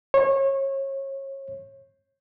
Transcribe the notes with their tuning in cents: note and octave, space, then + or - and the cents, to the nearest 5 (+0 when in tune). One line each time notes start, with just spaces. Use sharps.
C#5 -30